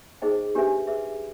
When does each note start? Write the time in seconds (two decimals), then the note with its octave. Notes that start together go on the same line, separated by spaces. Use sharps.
0.22 D#4 G#4 C5 D#5 G5
0.55 D4 G4 B4 E5 G#5
0.87 G#4 B4 E5